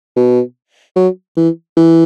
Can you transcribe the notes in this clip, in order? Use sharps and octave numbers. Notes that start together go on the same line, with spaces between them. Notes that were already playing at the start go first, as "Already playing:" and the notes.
B2
F#3
E3
E3